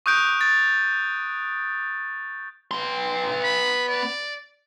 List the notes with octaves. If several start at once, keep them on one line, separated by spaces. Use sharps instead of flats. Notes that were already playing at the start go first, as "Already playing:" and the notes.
C#6 D#6 F#6 G6 D7
A6
B3 C6
B5
D5